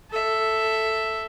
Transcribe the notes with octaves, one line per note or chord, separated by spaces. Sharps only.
A4 E5